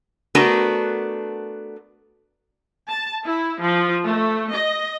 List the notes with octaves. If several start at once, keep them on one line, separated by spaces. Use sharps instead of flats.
A3 B3 D4 F#4 A#4
A5
E4
F3
A3
D#5